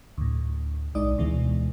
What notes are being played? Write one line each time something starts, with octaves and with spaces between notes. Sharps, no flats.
D2 A2
B1 G#3 D#4 D5 D#6
D2 B2 E3 G#3